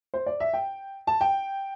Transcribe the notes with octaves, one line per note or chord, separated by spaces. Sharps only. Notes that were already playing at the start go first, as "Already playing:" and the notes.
C5
D5
E5
G5
A5
G5